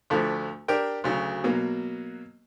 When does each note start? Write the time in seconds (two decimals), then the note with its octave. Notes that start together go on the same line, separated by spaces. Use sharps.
0.10 D2 D3 F3 A3
0.68 D4 G4 A#4 G5
1.04 D2 C#3 F#3
1.44 B2 F#3 A#3